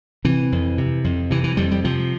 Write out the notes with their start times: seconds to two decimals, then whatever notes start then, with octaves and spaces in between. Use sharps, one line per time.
0.25 C3 E3
0.52 F2
0.78 C3
1.04 F2
1.30 C3 E3
1.44 E3
1.57 F2 G3
1.71 G3
1.84 C3 F3